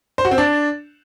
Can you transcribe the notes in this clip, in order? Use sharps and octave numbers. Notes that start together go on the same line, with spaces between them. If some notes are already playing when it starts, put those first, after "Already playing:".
C5
F#4
C4
D4